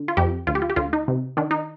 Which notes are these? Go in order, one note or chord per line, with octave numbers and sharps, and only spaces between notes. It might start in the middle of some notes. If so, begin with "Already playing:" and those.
Already playing: D3
F4
F2 G4
D2 F4
G4
F4
G4
D2 F4
D#4
C3
D#3 D4
D#4